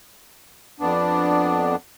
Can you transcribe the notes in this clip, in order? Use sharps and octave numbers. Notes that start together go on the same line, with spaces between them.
F2 B3 D4